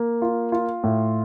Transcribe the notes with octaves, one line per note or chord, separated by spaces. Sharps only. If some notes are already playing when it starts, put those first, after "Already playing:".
Already playing: A#3
F4
F4
A2